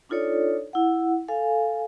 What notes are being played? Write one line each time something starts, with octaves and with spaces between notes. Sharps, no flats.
D4 D#4 F4 A4 C#5 D5
E4 F#5
A4 F5 G#5